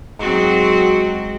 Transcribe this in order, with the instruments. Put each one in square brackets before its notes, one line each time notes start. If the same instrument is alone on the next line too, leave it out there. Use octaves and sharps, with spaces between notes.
[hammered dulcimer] G#2 [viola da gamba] F#3 C4 F#4